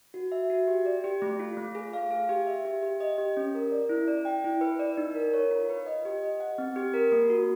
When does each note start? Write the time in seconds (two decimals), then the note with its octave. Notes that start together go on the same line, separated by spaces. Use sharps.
0.14 F#4
0.32 E5
0.50 F#4
0.68 G4
0.86 D5
1.04 G4
1.22 A3
1.39 F4
1.57 A3
1.75 G#4
1.93 F5
2.11 G#4
2.29 G4
2.47 E5
2.65 G4
2.83 G4
3.00 D#5
3.18 G4
3.37 C#4
3.54 A#4
3.72 D5
3.89 E4
4.08 D5
4.25 G5
4.44 E4
4.61 B4
4.79 D5
4.97 D#4
5.15 A#4
5.33 C#5
5.51 F4
5.69 B4
5.86 D#5
6.05 G4
6.22 D#5
6.40 F#5
6.58 C4
6.76 G4
6.94 A#4
7.12 A#3
7.30 F#4